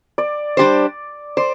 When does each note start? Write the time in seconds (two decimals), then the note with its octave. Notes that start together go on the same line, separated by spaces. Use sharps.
0.18 D5
0.57 G3 D4 G4 C5
1.37 C5 D5